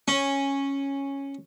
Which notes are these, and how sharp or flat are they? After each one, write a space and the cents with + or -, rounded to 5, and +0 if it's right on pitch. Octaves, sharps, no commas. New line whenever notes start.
C#4 -5